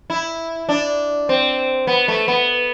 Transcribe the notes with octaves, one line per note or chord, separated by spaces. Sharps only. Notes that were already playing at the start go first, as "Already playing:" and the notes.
E4
D4
C4
B3
A3
B3